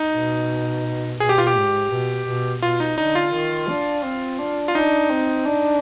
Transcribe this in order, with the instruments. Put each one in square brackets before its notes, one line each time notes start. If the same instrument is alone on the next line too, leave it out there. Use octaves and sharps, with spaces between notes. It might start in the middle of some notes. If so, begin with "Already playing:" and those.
Already playing: [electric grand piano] D#4
[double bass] B2
[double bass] B2 [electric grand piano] G#4
[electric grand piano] G4
F4
G4
[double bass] G#2
B2
B2
[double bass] B2 [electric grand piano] F4
[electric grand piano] D#4
[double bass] D3 [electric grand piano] D#4
[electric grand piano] F4
[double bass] D#3
D4
C4
D4
[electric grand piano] F4
[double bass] D4 [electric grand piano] D#4
[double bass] C4
D4